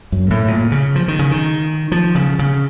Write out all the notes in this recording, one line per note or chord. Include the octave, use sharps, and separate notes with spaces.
F#2
A2
A#2
C#3
F3
D#3
C#3
D#3
F3
C#3
C#3